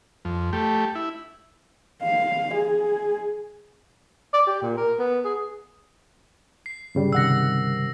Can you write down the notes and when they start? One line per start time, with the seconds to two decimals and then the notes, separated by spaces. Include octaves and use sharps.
0.25 F2
0.53 A3 G4
0.95 E4
2.03 F5
2.54 G#4
4.34 D5
4.47 G4
4.62 A#2
4.77 A#4
4.99 B3
5.25 G#4
6.66 C7
6.95 G2 C#3 G3
7.13 C3 D#3 F#5 E6 A#6